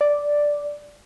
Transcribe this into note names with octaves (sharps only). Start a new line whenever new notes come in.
D5